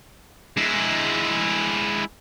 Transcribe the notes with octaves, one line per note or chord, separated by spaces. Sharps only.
G#3 E4